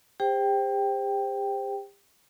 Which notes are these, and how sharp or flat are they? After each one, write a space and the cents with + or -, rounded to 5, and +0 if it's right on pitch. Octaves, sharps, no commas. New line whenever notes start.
G4 +40 C5 +0 G5 +0